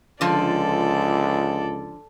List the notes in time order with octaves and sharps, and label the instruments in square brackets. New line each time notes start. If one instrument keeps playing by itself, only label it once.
[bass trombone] C#2 [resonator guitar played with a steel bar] D3 F3 [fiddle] A4 D5